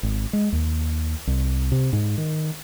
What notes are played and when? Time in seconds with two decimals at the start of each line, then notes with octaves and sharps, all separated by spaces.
0.03 G#1
0.33 G#3
0.52 D#2
1.27 C2
1.72 C3
1.93 G#2
2.18 D#3